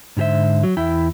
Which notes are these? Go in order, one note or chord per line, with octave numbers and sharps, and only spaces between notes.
G#2 D3 G4 C5 E5
F#3
E2 E4 E5 G5